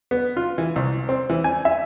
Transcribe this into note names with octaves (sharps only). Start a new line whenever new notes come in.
B3
F4
E3
C2
C4
E3
G#5
E5